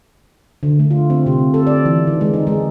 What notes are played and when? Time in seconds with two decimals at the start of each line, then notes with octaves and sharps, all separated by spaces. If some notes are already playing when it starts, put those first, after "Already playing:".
0.63 D3
0.79 A3
0.91 F4
1.10 C4
1.26 C3
1.54 A4
1.67 D5
1.85 E3
2.07 D#3
2.21 G#3
2.34 D#4
2.47 G#3